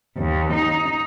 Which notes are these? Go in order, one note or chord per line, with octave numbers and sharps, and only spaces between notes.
D#2
D#4